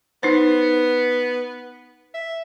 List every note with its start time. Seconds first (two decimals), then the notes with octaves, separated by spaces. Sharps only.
0.23 B3 D#4 C5
2.14 E5